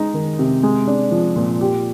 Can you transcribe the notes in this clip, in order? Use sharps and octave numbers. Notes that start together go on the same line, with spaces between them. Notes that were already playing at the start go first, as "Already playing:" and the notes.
Already playing: G#3 D#4
D#3
C3
G#3
D4
F3
A#2
G4